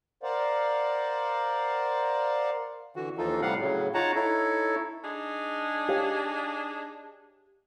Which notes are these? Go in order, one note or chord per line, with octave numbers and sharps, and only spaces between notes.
A#4 C5 D5 F5 F#5
D3 E3 F#4
D#2 E3 F3 D#4 F4 A4
A2 C3 G3 F5 F#5
A2 C#3 F#3
D#4 F4 C#5 F#5 A5 A#5
D#4 E4 A4 C#5
D4 D#4 G#4
G4 C#5 F5